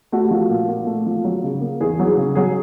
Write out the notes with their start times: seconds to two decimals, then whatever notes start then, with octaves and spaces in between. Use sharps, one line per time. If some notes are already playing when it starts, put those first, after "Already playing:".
0.12 A3 F#4
0.23 G4
0.31 F3 F#4
0.50 A#2
0.69 A#2
0.86 A3
1.06 F3
1.24 F#3
1.43 C#3
1.61 A#3
1.81 E2 G#4
1.99 F#3
2.07 G#4
2.18 C#3
2.35 F#3 G#4